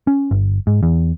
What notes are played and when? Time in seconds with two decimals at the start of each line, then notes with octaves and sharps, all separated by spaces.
0.07 C#4
0.31 G1
0.67 G#2
0.83 E2